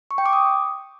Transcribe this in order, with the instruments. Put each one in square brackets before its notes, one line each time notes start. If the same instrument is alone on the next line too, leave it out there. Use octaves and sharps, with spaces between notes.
[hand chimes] C#6
G5
D6
D#6